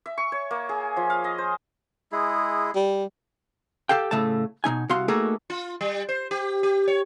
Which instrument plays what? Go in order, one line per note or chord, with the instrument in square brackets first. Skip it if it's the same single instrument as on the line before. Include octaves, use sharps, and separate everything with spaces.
[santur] E5
C#6
C#5
A#3
G#4
F3
F5
D#5
C5
[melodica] G#3 E4 G#4
[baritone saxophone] G3
[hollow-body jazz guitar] G4 A4 F5 G5
A2 C#3 A3 A5
B2 F#3 D#4 G#5
C2 F#4 F5 C6
A3 A#3 D#4 F#4 G#4 A4
[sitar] F4
G3
C5
G4
G4
C#5